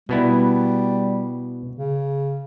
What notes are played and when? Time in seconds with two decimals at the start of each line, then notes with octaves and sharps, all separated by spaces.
0.09 B2 G3 B3 E4
1.75 C#3